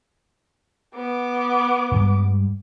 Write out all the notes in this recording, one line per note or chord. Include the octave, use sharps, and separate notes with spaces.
B3 D6
G2 G3 G#3